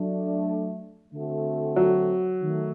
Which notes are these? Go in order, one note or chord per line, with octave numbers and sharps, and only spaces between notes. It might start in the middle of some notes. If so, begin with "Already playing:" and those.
Already playing: F#3 A3 D4
D3 A3 C4 F#4 A4
F#3
D#3 A3